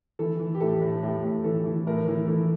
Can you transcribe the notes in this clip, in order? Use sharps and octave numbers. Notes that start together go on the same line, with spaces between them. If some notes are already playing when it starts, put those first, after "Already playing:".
E3 A4
E3
G4
A2 A4
A2
A2 G4
A2
E3 A4
E3
A2 A#4
E3
E3 A4